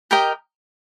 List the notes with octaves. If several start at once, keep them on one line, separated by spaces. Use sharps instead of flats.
G4 A#4 D#5 G5